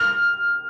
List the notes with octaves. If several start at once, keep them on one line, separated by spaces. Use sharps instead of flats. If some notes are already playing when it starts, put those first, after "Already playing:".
Already playing: F6